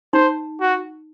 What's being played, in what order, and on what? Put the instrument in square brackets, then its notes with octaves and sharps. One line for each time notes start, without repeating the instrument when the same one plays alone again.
[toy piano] D#4 [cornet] C5
[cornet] F#4